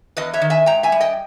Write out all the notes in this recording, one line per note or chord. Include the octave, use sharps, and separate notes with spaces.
E2 B4 D#5
C#5 E5
D#3
E5 G#5
G#2 G5 A#5
E5 G#5
G3
D#5 G5